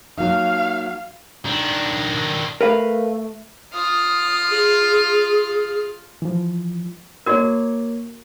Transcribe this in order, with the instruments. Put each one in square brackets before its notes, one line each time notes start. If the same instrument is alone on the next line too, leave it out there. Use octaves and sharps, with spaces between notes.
[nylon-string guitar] F#3 A#3 D#4 [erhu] F5
[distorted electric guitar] D#3 D4
[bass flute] A3 [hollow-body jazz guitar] A#4 B4 F5
[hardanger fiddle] F4 F5 [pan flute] D#6
[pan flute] G#4
[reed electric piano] E3 F3
[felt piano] A#3 C#5 G#6 [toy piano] F#4 A#4